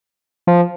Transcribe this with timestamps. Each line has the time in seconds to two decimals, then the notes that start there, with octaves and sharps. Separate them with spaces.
0.47 F3